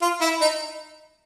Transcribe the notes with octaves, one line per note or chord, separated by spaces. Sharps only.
F4
E4
D#4